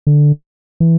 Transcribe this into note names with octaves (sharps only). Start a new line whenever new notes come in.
D3
E3